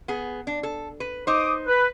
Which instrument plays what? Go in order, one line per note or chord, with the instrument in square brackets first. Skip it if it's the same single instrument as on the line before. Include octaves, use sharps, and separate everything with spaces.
[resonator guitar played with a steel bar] B3 G#4
D4
A4
B4
[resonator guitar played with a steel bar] D#4 C5 [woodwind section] D6 D#6
[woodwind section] B4